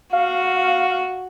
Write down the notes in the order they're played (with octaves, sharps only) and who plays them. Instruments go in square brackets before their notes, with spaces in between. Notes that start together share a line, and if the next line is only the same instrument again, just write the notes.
[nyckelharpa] F#4 [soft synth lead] F5